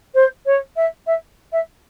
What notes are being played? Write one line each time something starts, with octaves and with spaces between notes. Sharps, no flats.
C5
C#5
E5
E5
E5